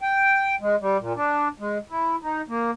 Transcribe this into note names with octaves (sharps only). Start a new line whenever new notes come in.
G5
G#3
G3
A#2
D4
G#3
E4
D#4
A#3